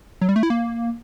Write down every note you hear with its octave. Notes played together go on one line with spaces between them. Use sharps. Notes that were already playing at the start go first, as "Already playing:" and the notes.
F#3
G3
A3
E4
A#3